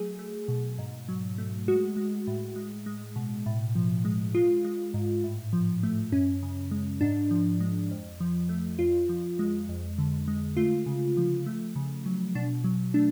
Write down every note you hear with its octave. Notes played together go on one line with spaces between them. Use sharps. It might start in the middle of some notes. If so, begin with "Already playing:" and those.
Already playing: F#3 A3 G#4
A3
B2
G#2
F#3
A3
G#3 F#4
G#3
A2
G#3
G#3
B2
A2
F3
G#3
G#3 F4
G#3
G#2
A2
F3
A3
F#2 C#4
C#3
G#3
G#2 D4
F3
G#3
F2
F3
A3
F2 F4
F3
G#3
F2
D3
G#3
A3 F4
C#3
F3
A3
C#3
F#3
B2 D4
F#3
A3 D4